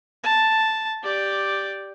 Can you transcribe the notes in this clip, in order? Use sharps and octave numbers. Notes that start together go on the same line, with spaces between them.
A5
G4 D5